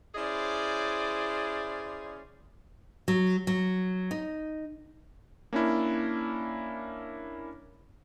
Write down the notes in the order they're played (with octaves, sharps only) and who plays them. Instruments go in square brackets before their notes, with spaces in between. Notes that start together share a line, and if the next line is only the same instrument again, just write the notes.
[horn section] C#4 E4 G#4 C5 D5
[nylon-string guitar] F#3
F#3
D#4
[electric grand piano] A#3 C#4 D4 E4